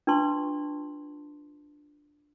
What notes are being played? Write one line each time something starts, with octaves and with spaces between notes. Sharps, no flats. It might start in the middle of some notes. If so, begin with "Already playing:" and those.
D4 F4 B4 A5 C6 C#6